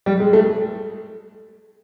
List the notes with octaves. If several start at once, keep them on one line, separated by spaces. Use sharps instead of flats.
G3
G#3
A3